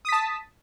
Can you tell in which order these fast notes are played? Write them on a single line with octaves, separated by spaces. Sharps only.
D#6 B6 A5